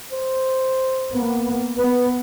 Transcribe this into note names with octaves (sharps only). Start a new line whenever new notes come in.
C5
A#3 B3
B3 B4